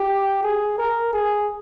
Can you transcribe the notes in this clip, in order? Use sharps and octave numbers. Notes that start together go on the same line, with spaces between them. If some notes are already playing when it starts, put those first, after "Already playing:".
Already playing: G4
G#4
A#4
G#4